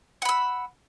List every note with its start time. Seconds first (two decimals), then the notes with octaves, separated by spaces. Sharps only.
0.22 F#5
0.25 B5
0.29 E6